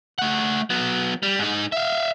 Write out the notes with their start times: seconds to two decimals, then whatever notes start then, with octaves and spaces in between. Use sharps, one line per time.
0.19 A3 F#5
0.70 F#3 B3
1.23 G3
1.39 G#2 D#4
1.72 E5 F5